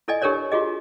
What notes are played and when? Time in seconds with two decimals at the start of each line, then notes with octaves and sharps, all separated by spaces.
0.08 E4 A4 D5 D#5 G#5
0.22 D4 G4 A4 A#4 C#5 D5
0.52 F4 F#4 G#4 D#5